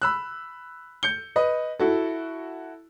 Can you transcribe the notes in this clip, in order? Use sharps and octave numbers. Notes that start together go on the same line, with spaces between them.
B5 E6 F#6
G6 C#7 G7
B4 D#5
E4 F#4 A4